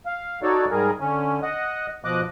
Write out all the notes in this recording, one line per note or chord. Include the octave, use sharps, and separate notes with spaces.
F5
D#4 F#4 A4 C#5 D5
G#2 G3 G#4 A#4
D3 C#4
D#5 F#5
B2 F3 D#5 D6 F#6